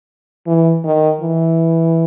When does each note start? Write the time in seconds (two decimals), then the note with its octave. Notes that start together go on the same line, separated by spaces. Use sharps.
0.47 E3
0.84 D#3
1.21 E3